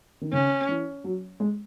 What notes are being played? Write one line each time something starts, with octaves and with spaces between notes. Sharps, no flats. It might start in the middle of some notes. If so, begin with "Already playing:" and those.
D#3
C#3 C#4
E3
F#3
G#3